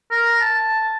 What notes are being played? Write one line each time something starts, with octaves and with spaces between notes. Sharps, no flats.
A#4
A5